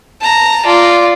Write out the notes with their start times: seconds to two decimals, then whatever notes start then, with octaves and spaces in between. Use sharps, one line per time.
0.21 A5 A#5
0.65 F4 D5